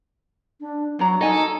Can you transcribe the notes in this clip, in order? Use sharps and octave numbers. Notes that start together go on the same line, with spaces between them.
D4
F#3 D4 C#5 A#5
D#4 A4 D#5 G#5